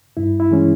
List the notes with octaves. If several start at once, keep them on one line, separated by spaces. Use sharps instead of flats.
G2 E4
E4
E3 G#3 C#4